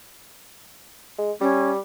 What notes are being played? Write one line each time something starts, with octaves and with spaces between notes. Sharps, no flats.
G#3
G3 C#4